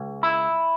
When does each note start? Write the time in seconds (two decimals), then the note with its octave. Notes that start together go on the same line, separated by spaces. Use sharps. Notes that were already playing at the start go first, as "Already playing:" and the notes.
Already playing: C#2
0.23 E4